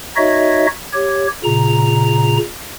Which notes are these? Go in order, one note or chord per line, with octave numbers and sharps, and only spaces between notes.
D#4 F#4 C#5 D#5 E5
G4 C#5
A#2 C#3 A#5